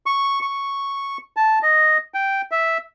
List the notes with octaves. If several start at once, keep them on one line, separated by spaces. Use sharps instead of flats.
C#6
C#6
A5
D#5
G5
E5